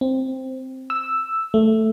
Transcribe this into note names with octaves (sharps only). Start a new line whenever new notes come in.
C4
E6
A3